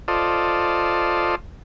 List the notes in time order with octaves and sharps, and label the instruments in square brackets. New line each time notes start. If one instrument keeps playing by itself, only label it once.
[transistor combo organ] F4 A4 C5 D5 D#5